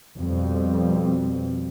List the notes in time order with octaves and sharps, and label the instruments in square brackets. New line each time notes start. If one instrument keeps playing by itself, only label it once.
[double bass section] F2 B2 G3